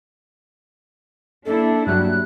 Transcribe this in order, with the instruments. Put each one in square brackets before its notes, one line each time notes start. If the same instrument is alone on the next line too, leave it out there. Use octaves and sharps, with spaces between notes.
[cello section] A#3 D4 E4 [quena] A4
[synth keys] G2 F#3 G3 [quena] F#6